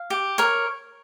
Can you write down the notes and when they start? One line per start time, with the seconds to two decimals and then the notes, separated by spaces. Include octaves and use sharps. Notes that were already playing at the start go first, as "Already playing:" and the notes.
Already playing: F5
0.10 G4
0.38 A#4 C#5